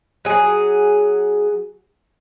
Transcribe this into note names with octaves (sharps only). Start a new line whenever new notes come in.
F#3 G#4